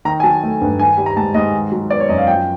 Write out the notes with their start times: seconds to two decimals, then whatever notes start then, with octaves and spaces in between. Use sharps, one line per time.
0.05 D#3 A#5
0.20 G#5
0.23 F#3 A5
0.43 A3
0.61 G2
0.79 D#3 G#5
0.97 G3
1.06 A#5
1.17 G#2 A5
1.34 G#2 D#5
1.53 D#3
1.72 F#3
1.90 B3 D5
2.00 C#5
2.09 F#2 D#5
2.18 F5
2.27 F3 G5